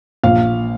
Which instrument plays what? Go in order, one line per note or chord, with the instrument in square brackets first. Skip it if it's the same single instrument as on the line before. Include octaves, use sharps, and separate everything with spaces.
[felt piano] A#1 F5